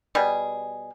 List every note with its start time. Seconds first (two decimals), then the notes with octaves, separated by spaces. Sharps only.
0.15 B2 G3 G#4